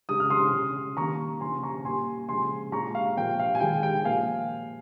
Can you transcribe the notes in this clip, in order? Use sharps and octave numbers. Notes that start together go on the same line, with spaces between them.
C#3 G#3 D#6
F6
C6 D#6
C#3 G#3
D#3 G3 A#3 A#5 C#6
C#3 F3 A#3 G#5 C6
A#5 C#6
A#2 G3 A#3 G#5 C6
C#3 F3 G#3 G#5 C6
A#2 G#3 A#5 C#6
F5
A#2 F3 A#3 G5
F5
G#5
D#3 G#3 G5
G5
A#2 F3 A#3 F5 G#5